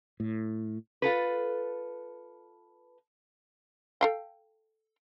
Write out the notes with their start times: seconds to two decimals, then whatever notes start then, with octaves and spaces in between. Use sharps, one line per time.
0.20 A2
1.02 F4 A4 B4
4.01 A4 F5 G5